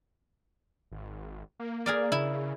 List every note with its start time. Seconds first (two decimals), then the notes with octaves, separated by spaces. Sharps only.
0.92 G#1
1.60 A#3
1.86 G#4 A#4 D5
2.12 C#3 E4